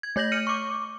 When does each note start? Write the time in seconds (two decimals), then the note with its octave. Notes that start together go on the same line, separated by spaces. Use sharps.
0.03 G#6
0.16 A3 C#5 G6 A#6 F#7
0.32 F6 C#7 D#7
0.47 C#6 D6